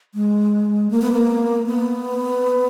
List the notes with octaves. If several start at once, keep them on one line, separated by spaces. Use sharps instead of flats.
G#3
A#3
B3
A#3
B3